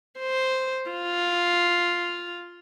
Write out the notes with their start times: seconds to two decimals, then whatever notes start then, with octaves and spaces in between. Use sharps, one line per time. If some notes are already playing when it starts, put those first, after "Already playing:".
0.19 C5
0.90 F4